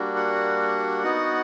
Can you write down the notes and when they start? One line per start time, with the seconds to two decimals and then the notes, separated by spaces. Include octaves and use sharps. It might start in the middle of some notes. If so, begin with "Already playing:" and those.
Already playing: G3 A#3 D4 F#4
0.16 F#5
1.04 B3 D#4 F#4